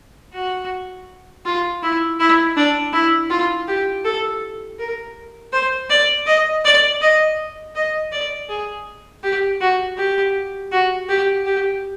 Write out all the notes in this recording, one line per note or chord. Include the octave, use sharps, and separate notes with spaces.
F#4
F4
E4
E4
D4
E4
F4
G4
A4
A#4
C5
D5
D#5
D5
D#5
D#5
D5
G#4
G4
F#4
G4
F#4
G4
G4